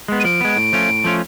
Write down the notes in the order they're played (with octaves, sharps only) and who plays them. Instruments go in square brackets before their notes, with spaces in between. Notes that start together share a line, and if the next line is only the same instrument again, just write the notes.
[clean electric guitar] G#3 B3
[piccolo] D#7
[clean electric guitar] F3 [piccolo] D7
[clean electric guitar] G#3 B3
A2
F3 A3 C#4 F4
A2
F3 A3 C#4 F4